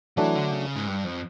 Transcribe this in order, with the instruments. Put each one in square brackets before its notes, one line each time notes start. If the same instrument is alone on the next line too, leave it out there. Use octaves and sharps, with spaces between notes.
[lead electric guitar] E3 [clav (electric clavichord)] F#3 A3 D4
[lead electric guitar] D3
C#3
G#2
G2
F2